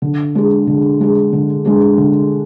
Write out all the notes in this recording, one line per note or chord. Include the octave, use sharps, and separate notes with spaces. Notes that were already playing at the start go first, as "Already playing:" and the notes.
D3
G#3 D4 G#4
D3
G#3 D4 G#4
D3
G#3 D4 G#4
D3